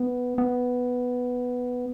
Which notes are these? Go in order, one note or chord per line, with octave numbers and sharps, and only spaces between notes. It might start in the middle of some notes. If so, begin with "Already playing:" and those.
Already playing: B3
B3